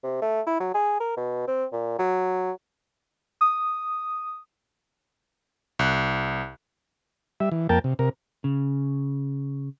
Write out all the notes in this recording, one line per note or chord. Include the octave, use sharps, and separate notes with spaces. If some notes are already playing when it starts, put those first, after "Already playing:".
C3
A3
E4
F#3
G#4
A#4
B2
C4
A#2
F#3
D#6
C2 F#6
G3 E5
E3
F2 A#3 A#4 G5 A5
C3
C3 A#4
C#3